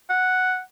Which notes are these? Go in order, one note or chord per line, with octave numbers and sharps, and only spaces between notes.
F#5